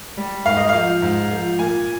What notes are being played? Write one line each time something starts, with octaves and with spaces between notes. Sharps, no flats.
G3
G#2 F5
D#5
F3 F5
G#2
F3
A#2 G#5